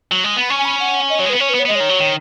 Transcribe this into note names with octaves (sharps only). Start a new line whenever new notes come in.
F#3
G#3
B3 B5
C#4 C#6
G#5
B5
F#5
D#5
F#3 C#5
G#3
B4
B3
C#4 C#5
B4
B3
C#5
B3
G#3 D#5
D#3 C#5
F#3
D#3